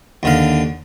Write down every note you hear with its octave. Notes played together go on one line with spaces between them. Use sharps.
D#2 D3 F5